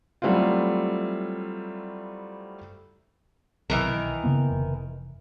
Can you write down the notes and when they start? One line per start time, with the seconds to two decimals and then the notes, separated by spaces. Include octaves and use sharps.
0.22 F#3 G3 A3 C4 E4 F4
3.70 B1 D#3 E3 A#4
4.24 C#3 A#3 B3
4.50 F1